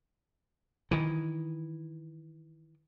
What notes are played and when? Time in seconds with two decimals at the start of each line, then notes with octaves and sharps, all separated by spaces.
0.91 D#3 E3